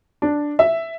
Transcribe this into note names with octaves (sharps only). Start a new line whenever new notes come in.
D4
E5